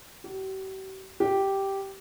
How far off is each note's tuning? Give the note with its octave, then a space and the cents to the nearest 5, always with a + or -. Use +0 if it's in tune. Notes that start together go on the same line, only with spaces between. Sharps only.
G4 -45
G4 -5